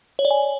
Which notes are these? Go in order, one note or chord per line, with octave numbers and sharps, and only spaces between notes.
C#5
D5
G#5